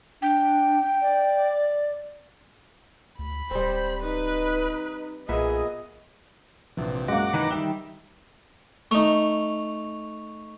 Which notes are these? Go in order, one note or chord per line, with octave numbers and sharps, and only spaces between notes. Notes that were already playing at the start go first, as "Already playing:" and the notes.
D4 G5
D5
D2 B5
D1 G3 C4 C5
D#4 B4
B1 A#2 B3 G#4 D#5 E5
A#1 C3 E3
F#2 G#3 A#3 F#4 F#5 D6
D#3 E3 D#4
D#3 G3 D#4 E5 G5 G7
A3 D#4 C#6 F7